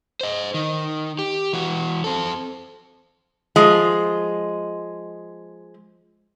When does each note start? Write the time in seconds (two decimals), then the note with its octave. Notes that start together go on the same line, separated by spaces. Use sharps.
0.21 C5 D#5
0.54 D#3
1.19 G4
1.53 E3 F#4
2.04 C4 A4
3.56 F3 G#3